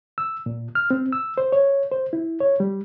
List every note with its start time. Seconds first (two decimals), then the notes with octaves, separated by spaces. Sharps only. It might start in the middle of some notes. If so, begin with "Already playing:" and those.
0.18 E6
0.46 A#2
0.75 F6
0.91 C4
1.12 E6
1.38 C5
1.52 C#5
1.91 C5
2.13 E4
2.40 C#5
2.60 G3